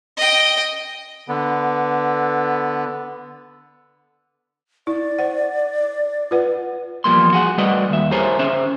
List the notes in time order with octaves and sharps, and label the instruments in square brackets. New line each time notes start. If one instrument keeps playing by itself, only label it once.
[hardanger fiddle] D#5 G5
[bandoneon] D3 B3
[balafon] E4 [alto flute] D5
[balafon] C5 F#5
F4 B4 F#5
[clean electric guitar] E2 F3 G3 A#3 C6
F#4 G#4 F#5
G3 A3 F#4 B4 D5 D#5
D#2 E5
E4 G4 G#4 A#4 C5 C#5
C#4 C5 E5